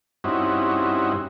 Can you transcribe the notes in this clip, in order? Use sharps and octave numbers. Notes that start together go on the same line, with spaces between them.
G2 C4 C#4 D#4 E4 F#4